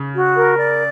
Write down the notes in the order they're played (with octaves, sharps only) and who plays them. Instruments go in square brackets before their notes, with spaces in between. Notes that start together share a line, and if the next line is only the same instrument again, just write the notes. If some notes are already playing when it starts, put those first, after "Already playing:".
Already playing: [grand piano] C#3
[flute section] F#4
A#4
D5